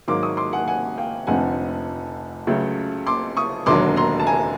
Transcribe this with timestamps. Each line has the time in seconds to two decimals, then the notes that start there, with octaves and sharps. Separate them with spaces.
0.08 G#2 D#3 F#3 A#3 C6 D6
0.23 C#6 D#6
0.37 C6 D6
0.53 F#5 G#5
0.68 F#5 G#5
0.98 F5 G5
1.27 F1 F2 D3 F3 A3 F#5 G#5
2.47 C#2 C#3 F#3 A3
3.07 C6 D6
3.37 C#6 D#6
3.66 E1 D#2 D3 F#3 C6 D6
3.96 A#5 C6
4.20 A5
4.27 G#5 A#5